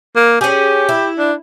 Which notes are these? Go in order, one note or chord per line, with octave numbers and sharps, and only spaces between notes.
A#3
C#4 G4 G#4
E4
D4